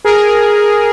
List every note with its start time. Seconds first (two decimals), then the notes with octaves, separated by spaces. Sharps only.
0.05 G#4 A#4